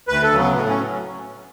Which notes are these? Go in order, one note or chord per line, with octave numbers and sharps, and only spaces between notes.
D2 B4
A4
C#3 F#3
B3
A2 B3
C#4
F#3